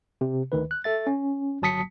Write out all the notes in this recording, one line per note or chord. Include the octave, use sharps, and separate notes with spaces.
C3
D2 D#3 B4
F#6
A4 E5 A6
C#4
G1 F#3 A5 D#6 B6 C#7